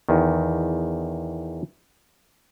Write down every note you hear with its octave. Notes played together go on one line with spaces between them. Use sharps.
E2 D#3